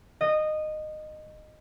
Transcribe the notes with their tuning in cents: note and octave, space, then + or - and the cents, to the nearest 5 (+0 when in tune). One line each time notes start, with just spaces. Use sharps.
D#5 -15